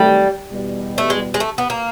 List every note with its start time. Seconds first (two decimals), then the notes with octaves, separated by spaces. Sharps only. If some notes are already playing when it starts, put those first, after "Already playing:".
Already playing: C3 D#3 F#3 G3 A3
0.51 E2 B2 G3
0.98 A3
1.10 G#3
1.34 G#3
1.40 A3
1.58 B3
1.70 A#3